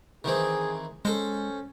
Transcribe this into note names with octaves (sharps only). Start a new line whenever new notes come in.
D#3 E3 C4 G#4
G#3 C#4 A4 C5